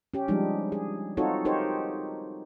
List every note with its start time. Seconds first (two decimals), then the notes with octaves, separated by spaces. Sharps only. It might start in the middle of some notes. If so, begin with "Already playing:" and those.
0.14 C#4 G4
0.28 F3 G3 G#3 D4 D#4
0.72 G#4
1.17 C4 D#4 F4 F#4 A4 C#5
1.45 D#4 G4 A#4 C5 C#5